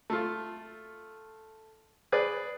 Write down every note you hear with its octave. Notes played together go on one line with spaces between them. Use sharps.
A3 F4
G#4 B4 D5